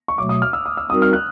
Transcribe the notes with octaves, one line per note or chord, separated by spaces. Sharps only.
C#6
B2 F#3 A3 D6
D#6
F6
E6
D#6
E6
G3 C4 D#4 F#4 A#4 D#6
F6
F#6